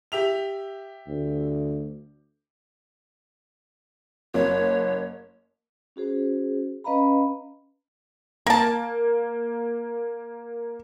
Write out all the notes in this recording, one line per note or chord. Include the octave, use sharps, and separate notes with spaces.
G4 E5 F7
D2
F#1 C#5
C#4 F#4 G#4 C5
C#4 B4 D#5 F5 A#5 B5
A#3 A#4 A5